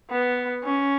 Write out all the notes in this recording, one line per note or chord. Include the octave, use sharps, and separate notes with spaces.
B3
C#4